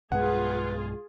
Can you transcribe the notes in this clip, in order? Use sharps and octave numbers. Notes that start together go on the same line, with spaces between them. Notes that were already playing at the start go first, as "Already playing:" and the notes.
B1 G2 G#3 F4 G#4 B4 F#5